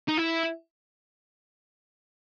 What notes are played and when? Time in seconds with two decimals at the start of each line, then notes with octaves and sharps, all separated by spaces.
0.09 D#4
0.18 E4